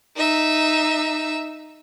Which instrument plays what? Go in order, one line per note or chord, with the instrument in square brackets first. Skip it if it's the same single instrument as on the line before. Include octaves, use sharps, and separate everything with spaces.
[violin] D#4 E5